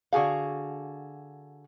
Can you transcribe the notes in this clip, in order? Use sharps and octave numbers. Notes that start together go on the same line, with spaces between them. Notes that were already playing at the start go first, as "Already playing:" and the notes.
D3 F#4 G#4 F5